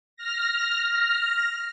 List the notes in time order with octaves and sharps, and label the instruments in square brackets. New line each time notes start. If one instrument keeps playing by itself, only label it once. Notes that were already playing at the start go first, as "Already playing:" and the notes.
[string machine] F6 A#6